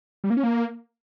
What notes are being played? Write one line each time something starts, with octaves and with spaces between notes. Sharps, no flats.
G3
A#3
C#4
A#3